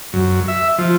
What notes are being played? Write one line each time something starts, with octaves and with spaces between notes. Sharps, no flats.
F#2
E5
F3